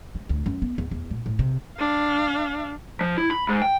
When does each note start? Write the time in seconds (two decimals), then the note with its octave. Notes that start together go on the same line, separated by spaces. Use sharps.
0.15 G#3
0.29 D2
0.46 F#2
0.62 B3
0.78 E2
0.91 E2
1.11 A#2
1.26 A2
1.39 C3
1.78 D4 F5
3.01 F3
3.18 E4
3.31 B5
3.49 G#2
3.62 G5